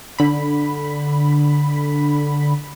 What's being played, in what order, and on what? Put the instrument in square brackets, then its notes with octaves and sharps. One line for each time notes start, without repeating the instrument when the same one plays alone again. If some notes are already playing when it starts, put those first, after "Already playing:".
[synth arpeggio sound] D3 B5